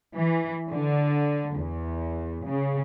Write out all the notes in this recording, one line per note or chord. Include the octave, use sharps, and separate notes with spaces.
E3
D3
E2
C#3